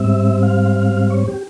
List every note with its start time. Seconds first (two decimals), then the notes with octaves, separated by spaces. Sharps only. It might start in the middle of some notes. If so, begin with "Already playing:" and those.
Already playing: G#2 G3 C4 E5
0.43 F5
0.76 F5
1.10 C#5
1.28 G4